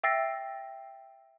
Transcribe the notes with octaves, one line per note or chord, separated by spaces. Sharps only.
E5 G5 E6 A6 A#6 C7